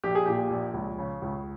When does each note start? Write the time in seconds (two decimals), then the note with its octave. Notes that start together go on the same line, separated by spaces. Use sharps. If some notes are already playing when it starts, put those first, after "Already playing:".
0.04 A#1 G4
0.15 G#4
0.26 A#2 G4
0.51 A#1
0.74 C#2
0.98 C#3
1.22 C#2